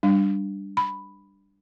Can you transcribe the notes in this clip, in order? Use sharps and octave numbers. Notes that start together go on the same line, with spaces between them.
G3 D4
B5